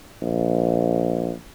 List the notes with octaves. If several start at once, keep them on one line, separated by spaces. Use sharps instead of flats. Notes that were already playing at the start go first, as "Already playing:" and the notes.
A#1